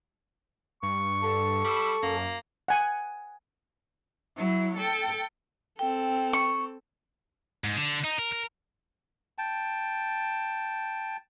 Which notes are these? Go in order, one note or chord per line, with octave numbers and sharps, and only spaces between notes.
G2 C#6
D3 A4
G3 B5 E6
F#2 A#3
F#5 G#5
F#3 E4
A4 G5
C4 A4 G5
C#6
G#2
D3
D#4
A#4
A#4
G5 A5